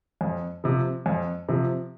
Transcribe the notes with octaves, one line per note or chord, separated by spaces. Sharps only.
F2
C3 F3
F2
C3 F3